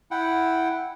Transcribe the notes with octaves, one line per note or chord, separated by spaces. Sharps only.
E4 F#5 G5